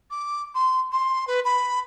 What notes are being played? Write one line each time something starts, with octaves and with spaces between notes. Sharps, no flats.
D6
C6
C6
B4
B5